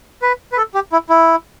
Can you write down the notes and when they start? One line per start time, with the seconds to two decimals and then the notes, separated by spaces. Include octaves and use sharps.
0.22 B4
0.52 B4
0.57 A4
0.74 G4
0.92 E4
1.09 E4